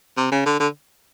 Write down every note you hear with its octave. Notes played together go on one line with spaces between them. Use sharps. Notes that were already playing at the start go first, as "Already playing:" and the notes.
C3
C#3
D3
D3